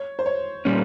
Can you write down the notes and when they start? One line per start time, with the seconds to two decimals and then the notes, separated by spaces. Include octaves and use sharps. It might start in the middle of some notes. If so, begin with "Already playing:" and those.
Already playing: C#5
0.19 C5
0.26 C#5
0.65 A#2 G3 C#4